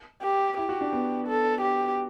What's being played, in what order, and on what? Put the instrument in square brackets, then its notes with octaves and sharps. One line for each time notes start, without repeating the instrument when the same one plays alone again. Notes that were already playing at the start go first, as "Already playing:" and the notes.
[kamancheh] G4
[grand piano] E4 [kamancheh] G4
[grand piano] F#4
D4
B3
[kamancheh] A4
G4